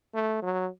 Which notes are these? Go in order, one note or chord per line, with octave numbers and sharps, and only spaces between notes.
A3
F#3